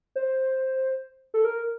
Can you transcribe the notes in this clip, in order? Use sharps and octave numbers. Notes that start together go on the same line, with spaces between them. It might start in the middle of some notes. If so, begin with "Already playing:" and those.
C5
A4
A#4